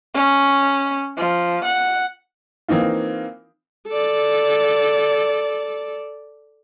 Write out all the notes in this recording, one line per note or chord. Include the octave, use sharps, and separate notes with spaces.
C#4
F3
F#5
E3 A#3 C4 D#4 F4
A4 D5